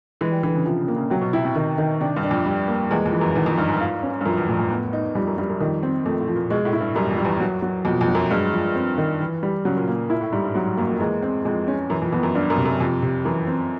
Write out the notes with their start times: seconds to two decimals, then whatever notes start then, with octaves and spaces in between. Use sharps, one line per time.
0.21 E3 G#3
0.32 G3
0.43 D3 E3
0.55 C#3
0.66 C3 F3
0.81 C#3
0.88 A#3
0.96 C#3
1.10 C3 F#3
1.21 B2
1.33 C3 E4
1.45 C3
1.56 D#3
1.78 D#3
2.01 C3 D4
2.16 G2
2.23 D4
2.31 F2
2.46 G3
2.68 A#3
2.90 E2 G#3
3.06 F2
3.13 E3
3.21 F#2
3.35 E2 D#3
3.46 F2
3.58 G2 D#4
3.69 G#2
3.81 F4
4.03 C#4
4.21 G2
4.25 F#2 F3
4.37 E2
4.49 F2 A2
4.59 F2
4.71 B3
4.93 D#4
5.15 F2 G3
5.27 F#2
5.38 G2 G3
5.50 F#2
5.60 F2 D#3
5.83 C4
6.06 F2 A3
6.20 A2
6.28 F3
6.35 A#2
6.50 B2 G#3
6.65 A2
6.73 E4
6.80 G2
6.95 F#2 G3
7.11 F2
7.18 G3
7.25 E2
7.40 F#3
7.62 F#3
7.85 F2 B2
8.01 F2
8.08 F#3
8.15 F#2
8.30 G2 G#3
8.53 F3
8.75 C4
8.98 D#3
9.20 E3
9.43 G3
9.65 C#3 F#3
9.77 A#2
9.88 A#2 A#3
10.10 A#2 E4
10.21 A2
10.32 G#2 G3
10.44 G2
10.54 G#2 F#3
10.66 G#2
10.77 F#2 A#3
10.89 F2
11.00 E2 G#3
11.22 C4
11.45 F2 G#3
11.68 C#4
11.90 F#2 E3
12.02 F2
12.12 F2 B3
12.23 F#2
12.35 G2 D4
12.50 F#2
12.58 C3
12.66 F#2
12.80 F2 C3
13.02 C3
13.25 F#2 E3
13.47 C4